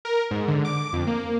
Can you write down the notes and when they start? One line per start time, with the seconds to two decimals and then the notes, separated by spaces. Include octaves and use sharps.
0.05 A#4
0.31 G#2
0.48 D3
0.65 D6
0.93 F2
1.07 A#3